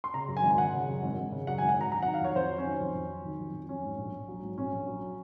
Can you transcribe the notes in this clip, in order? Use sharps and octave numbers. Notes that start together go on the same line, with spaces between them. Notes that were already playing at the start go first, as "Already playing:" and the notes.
C6
C#3 A#5
F#2
G#5
G#1
G#5
G#1 F#5
C#3
F#2
G#1
G#1
C#3
F#2 F#5
G#1 G#5
F#5
G#1 A#5
F#3 A#5
D#3 F#5
F5
F2 C#5
F2 C5
F#3
C#4
D#3
F2
F2
F#3
D#3
F2
F2
F#3 C#4
G#2
A#1
A#1
F#3
G#2
A#1 C#4
A#1
F#3